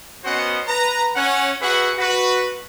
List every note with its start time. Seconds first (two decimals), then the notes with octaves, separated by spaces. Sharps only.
0.24 B3 C#4 F#4 C5 D#5 F#5
0.68 B4 A#5
1.16 C#4 F#5 G#5
1.61 F#4 G#4 B4 E5 F#5
1.98 F#4 B4